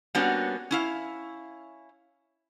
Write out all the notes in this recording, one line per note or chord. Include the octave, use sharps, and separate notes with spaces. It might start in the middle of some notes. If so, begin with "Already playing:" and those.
G3 A#3 B3 C#4 D4 F#4
C#4 E4 F5